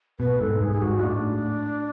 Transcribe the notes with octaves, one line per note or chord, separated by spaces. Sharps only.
B2 B4
G#2 A4
G#2 G#4
G#4
G#2 F#4
A2 D4